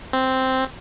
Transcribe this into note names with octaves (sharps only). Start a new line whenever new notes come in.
C4